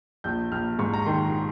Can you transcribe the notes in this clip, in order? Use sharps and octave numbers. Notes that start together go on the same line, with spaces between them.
A#1 G6
A#1 F6
G#2 C#6
A#5
D#3 C6